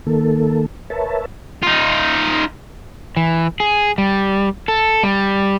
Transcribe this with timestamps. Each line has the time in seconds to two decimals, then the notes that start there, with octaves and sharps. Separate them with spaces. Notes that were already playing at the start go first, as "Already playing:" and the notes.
0.07 D#3 A#3 A4
0.90 A#4 B4 C#5 E5 A5
1.63 D#4 F4
3.17 E3
3.60 G#4
3.98 G3
4.68 A4
5.03 G3